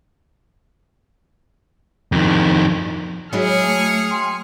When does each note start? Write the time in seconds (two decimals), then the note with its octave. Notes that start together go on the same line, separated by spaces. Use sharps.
2.12 F2 D#3
3.33 F#3 G#3 E4 G#4 F6 C#7
3.64 A3
4.10 G5 G#5 C6